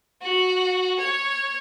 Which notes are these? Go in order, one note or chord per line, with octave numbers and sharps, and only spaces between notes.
F#4
C#5